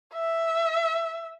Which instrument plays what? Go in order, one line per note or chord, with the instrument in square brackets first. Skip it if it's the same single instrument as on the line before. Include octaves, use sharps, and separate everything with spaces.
[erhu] E5